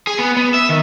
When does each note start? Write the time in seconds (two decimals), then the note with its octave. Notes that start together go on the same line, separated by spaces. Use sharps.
0.07 G#4
0.19 B3
0.37 B3
0.54 E5
0.69 D#3